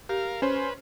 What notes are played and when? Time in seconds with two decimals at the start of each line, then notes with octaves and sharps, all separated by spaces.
0.09 G4 A#4 F5
0.42 C#4 B4 C5 C6